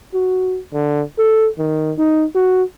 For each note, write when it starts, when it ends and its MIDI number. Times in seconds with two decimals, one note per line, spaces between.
0.14 0.59 66
0.73 1.02 50
1.19 1.48 69
1.59 1.93 51
1.98 2.25 63
2.35 2.63 66